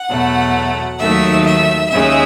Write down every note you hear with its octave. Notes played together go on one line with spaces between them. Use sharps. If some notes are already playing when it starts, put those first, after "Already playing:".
Already playing: F#5
E2 B2 F#3 A3
D#2 D#3 F#3 A3 E5
E5
D#2 C#3 G#3 E5